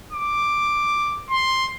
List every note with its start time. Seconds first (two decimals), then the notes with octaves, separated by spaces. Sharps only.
0.13 D6
1.31 C6